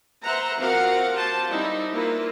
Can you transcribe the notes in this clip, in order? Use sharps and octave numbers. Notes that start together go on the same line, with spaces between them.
B4 C5 E5 F#5 A#5
F3 C4 F#4 A#4 F5 F#5
F4 G4 C5 A5
G3 C4 D#4 E4
A#3 E4 F4 B4